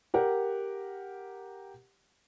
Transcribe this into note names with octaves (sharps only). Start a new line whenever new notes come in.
G4 A#4 F#5